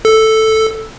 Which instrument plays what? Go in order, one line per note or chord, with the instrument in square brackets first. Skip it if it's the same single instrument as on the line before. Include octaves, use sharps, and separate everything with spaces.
[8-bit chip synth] A4